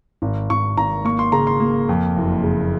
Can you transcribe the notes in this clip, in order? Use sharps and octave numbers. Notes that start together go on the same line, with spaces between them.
G#1
G#1 C#6
G#1 A#5
A#3 C#6
C6
C#3 A#5
C6
A#3
F2
F#1
C#3